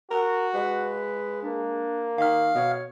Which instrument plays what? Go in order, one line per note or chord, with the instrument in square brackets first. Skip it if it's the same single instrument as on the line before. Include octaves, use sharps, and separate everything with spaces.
[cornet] F#4 [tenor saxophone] A#4
[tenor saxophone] G#3 [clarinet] B4
[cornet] A#3 [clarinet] D4
[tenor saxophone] D#3 [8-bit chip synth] F5 F6
[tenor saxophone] B2 [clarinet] C#5